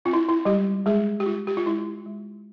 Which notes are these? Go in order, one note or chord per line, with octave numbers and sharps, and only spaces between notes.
C4 F4
E4
E4
G3 G#3 G4
G#3 G#4
G4
G#3 F4
G4
F4
G#3 E4
G#3